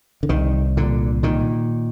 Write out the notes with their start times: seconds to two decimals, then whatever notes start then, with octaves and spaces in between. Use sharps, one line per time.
0.23 D3
0.29 C2 D#3
0.77 A#2 D3
1.23 A#2 D#3